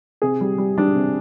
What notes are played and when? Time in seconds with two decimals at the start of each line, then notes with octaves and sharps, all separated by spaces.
0.22 C3 G#4
0.41 G3
0.58 G3
0.78 G3 D4
0.95 C3